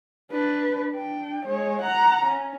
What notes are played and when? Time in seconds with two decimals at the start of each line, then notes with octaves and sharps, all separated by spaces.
0.32 D4 B4
0.93 D4 G5
1.45 G#3 C#5
1.82 F#5 A#5
2.25 C#4